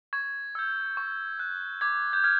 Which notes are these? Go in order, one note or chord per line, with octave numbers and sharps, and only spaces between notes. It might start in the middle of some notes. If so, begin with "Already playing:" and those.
C#6 G#6
E6 G6
C#6
F#6
D6 G#6
G6
F6 G#6